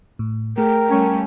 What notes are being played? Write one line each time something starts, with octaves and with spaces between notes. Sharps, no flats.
A2
A3 G#4 A#4 G5
G3 A3 C#4 F5 G#5 C#6